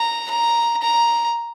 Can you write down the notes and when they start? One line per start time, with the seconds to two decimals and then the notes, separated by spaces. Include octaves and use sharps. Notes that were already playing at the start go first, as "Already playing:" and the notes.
Already playing: A#5
0.30 A#5
0.82 A#5